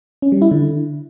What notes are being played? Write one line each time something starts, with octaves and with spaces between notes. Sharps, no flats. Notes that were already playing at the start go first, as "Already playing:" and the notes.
C#4
G3
E4
D3